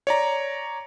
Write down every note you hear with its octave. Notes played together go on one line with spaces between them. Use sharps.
C#5 D5 A#5